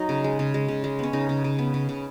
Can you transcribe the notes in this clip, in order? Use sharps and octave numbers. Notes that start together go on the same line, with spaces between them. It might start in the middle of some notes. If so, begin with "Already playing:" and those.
Already playing: F#3 D#4 D#5
C#3
G#3
C#3
G#3
C#3
G#3
B3 C#4
C#3 D#4
C#3
C#3
B3
C#3
C#3